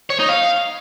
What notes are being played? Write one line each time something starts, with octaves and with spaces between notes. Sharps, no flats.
C#5
D#4
F5